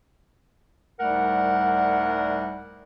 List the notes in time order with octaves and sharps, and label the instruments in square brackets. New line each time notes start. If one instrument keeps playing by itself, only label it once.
[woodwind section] C2 G#2 G3 A3 A#4 F#5